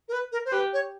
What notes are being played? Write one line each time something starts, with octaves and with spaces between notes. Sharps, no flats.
A#4
B4
A#4
C5
G4 B4
C#5